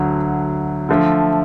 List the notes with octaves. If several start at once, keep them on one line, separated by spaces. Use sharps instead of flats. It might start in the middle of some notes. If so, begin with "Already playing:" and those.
Already playing: D2 D3 F#3
D3 F3 A3